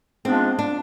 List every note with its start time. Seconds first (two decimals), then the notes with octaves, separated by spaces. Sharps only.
0.25 G#2 G#3 B3 C4 D4 F4
0.59 D4